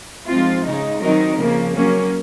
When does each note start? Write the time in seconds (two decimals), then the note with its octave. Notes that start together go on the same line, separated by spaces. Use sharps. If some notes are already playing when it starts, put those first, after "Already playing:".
0.28 G#2 F3 C4 F4
0.64 C#3 G#3 D#4
1.01 D#3 F#3 C4 D#4 A#4
1.38 F2 C#3 F3 A#3
1.74 F#3 A#3 C#4